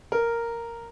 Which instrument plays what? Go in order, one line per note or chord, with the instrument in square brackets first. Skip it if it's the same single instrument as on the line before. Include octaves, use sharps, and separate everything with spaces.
[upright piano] A#4